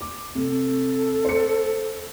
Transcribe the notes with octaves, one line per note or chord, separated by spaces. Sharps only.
D6
C3 A4
C5 C#7